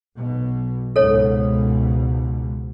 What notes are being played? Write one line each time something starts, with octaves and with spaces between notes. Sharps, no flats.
B1 B2
C#2 G#2 B2 A4 C#5